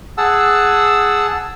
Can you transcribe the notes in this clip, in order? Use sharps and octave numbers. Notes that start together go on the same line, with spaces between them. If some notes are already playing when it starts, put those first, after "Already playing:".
G#4 F#5 A5 E6